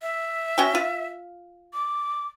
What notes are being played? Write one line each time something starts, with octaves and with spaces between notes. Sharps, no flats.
E5
C#4 F#4 G5
F4
D6